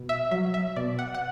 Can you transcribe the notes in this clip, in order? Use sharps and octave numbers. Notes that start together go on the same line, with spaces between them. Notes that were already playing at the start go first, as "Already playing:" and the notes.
Already playing: B2
E5
F#3 E5
E5
B2 D5
F#5
F#5